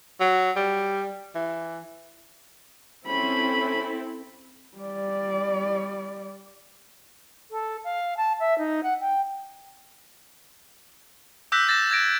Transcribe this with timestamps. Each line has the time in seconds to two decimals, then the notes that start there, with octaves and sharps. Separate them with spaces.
0.20 F#3
0.56 G3
1.35 E3
3.06 C4 C#4 E4 A4 B5
4.78 G3 D5
7.50 A4
7.84 F5
8.17 A5
8.39 E5
8.58 D#4
8.83 F#5
9.00 G5
11.52 D6 E6 F#6 G6 A#6 B6
11.67 E6 A6 A#6 E7
11.90 E6 G#6 A#6 D7